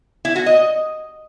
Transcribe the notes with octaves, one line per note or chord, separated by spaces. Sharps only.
E4
F#4
D#5